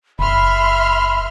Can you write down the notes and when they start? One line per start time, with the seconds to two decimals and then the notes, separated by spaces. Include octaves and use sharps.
0.19 F#1 E5 B5 C6 F6